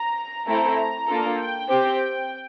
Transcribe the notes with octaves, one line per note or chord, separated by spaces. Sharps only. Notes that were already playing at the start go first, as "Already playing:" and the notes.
Already playing: A#5
A3 C4 E4 A4 A#5
A#3 D4 F4 A4
G5
C4 G4